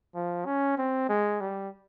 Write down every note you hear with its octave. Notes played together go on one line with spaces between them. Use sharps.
F3
C#4
C4
G#3
G3